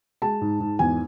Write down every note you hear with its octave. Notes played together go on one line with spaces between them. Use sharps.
G#3 A5
G#2
G#2
E2 G#5